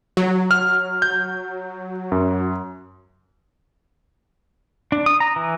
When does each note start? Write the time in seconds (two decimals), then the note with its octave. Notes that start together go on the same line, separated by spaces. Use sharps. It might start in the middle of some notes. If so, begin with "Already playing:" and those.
0.17 F#3
0.51 F6
1.02 G6
2.12 F#2
4.92 D4
5.06 D#6
5.20 A#5
5.36 E3